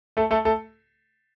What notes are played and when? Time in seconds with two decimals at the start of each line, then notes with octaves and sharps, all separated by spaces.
0.17 A3 A4
0.31 A3 A4
0.45 A3 A4